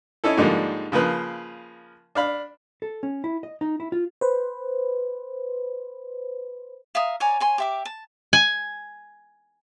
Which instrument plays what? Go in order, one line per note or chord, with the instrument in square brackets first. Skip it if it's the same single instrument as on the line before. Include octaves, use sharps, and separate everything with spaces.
[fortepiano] C#4 D#4 E4 A4
G#2 D3 F3 G3 A#3
C#3 F3 A#3 B4
D4 F5 B5
[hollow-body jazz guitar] A4
C#4
E4
D#5
D#4
E4
F4
[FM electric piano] B4 C5
[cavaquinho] E5 F5 A#5 D#6
C#5 D5 G#5 A#5
C#5 G#5 C6
G4 E5 D6
A5
[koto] G#5